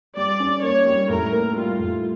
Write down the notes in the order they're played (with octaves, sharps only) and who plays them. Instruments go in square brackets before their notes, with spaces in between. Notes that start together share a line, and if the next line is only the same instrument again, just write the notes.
[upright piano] G3 [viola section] D5
[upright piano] C#4
[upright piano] A#3 [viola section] C#5
[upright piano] G3
[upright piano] A2 [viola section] A#4
[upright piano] A#3
[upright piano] G3 [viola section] F4
[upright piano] A2